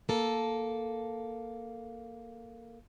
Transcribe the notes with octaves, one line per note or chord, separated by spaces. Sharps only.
A#3 A4